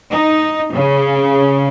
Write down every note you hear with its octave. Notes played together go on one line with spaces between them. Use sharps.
D#4
C#3